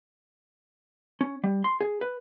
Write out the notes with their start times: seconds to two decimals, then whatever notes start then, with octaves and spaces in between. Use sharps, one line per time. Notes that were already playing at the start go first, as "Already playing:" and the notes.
1.21 C#4
1.44 G3
1.64 C6
1.81 G#4
2.01 B4